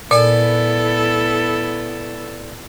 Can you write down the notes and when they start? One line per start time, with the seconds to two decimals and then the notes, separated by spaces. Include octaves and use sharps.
0.11 A#2 B3 E4 A4 D5 G#5